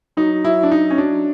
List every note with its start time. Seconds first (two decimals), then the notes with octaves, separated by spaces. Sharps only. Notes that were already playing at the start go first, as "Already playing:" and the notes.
0.17 F#3 D#4
0.44 F#3 E4
0.63 D4
0.71 F#3 D#4
0.90 C#4
0.98 F#3 D4